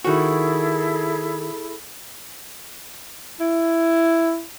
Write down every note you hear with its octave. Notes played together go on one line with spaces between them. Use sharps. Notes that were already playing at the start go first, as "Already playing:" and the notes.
D#3 E4 F#4 G#4 A4
E4